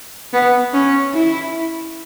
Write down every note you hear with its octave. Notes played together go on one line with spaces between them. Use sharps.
B3
C#4
E4